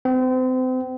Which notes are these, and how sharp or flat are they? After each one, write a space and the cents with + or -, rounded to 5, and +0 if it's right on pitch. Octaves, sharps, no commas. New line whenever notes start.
C4 -35